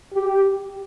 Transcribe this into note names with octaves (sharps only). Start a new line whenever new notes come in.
G4